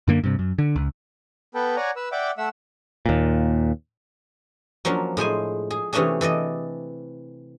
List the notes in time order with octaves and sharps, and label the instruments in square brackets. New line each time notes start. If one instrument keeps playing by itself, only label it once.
[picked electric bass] F#2 D3 A#3
G2 C3
F#2
D3
C#2
[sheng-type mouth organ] B3 A4 B4 G5
C#5 D5 F#5 G#5 A#5
B4 E6
D5 E5 F#5 G5 D6
A3 E5 F#5 E6
[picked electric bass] D#2 A#2
[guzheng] F3 F#3 A#3 C#4 D4
A2 G#3 C5 G#5
G#4
C3 E3 A3 C#4 D4 G#4
E3 A4 D5 D#5